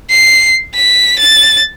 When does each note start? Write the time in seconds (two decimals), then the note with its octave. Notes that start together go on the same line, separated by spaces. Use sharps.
0.11 C7
0.75 B6
1.19 A6